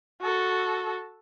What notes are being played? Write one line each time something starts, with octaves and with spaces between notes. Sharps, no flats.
F#4 A4